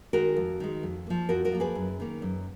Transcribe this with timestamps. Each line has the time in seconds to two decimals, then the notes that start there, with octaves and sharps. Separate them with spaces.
0.13 D#3 G#3 F#4 A#4
0.36 F2
0.60 D#3 G#3
0.83 F2
1.07 F3 A#3
1.29 F2 F#4 A#4
1.45 F#4 A#4
1.52 F3 A#3
1.60 G#4 B4
1.75 F#2
2.00 D#3 A#3
2.22 F#2